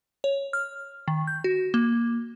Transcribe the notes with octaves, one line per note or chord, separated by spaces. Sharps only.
C#5
F6
D#3
G6
F#4
A#3